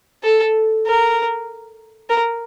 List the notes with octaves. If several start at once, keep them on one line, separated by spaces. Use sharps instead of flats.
A4
A#4
A#4